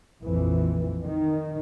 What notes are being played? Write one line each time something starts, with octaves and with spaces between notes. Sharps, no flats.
A#1 F2 E3
D#3